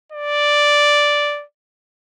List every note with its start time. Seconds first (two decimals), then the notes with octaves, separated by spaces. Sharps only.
0.12 D5